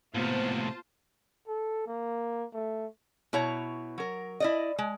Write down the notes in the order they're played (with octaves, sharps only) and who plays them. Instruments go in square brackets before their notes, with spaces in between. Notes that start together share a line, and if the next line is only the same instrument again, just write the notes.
[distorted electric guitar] A2 C3 [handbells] A#3 B3 [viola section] F4 C5 A5
[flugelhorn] A4
A#3
A3
[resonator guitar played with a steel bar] B2 E4 C#5 A#5
F#3 A#4
E4 D5 D#5
G#3